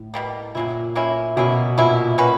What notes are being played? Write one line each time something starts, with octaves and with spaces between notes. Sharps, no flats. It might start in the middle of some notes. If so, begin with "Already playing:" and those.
Already playing: A2
B2 G3 A#3
A#2 F#3 A#3 C#4 E4
F#3 A#3 C#4 E4
B2 F#3 A#3 C#4 E4
A#2 F#3 A#3 C#4 E4
A#3 C#4 F#4 B4